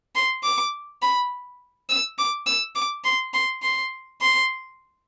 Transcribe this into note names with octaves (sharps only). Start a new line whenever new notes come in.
C6
D6
B5
E6
D6
E6
D6
C6
C6
C6
C6